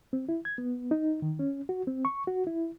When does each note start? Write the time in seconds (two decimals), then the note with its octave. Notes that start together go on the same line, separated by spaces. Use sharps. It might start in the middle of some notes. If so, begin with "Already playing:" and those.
0.13 C4
0.29 E4
0.45 G#6
0.58 B3
0.91 D#4
1.22 D#3
1.39 C#4
1.69 F#4
1.87 C4
2.05 C#6
2.27 F#4
2.47 E4